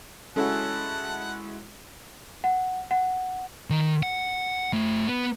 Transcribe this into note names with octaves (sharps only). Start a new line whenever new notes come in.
G#3 C#4 E4 F#4 A4 F#5 A5
F#5
F#5
D#3
F#5
A3 F4
B3